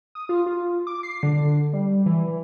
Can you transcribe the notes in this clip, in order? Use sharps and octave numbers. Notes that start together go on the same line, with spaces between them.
D#6
F4
F4
D6
C7
D3
G3
E3